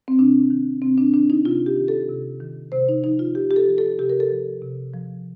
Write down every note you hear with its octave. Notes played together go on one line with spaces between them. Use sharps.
C4
C3 D4
D#3
C3 C4
D4
D#3 D4
D#4
C3 F4
G4
D#3
A4
C3
D#3
C3 C5
D#4
F3 D#4
F4
C3 G4
G4
A4
F3
A4
C3 G4
A#4
A4
F3
C3
F3